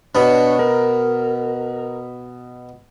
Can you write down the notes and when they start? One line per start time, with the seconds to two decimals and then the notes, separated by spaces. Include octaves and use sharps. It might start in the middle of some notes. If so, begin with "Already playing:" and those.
0.15 B2 B3 D4 C#5
0.59 A#4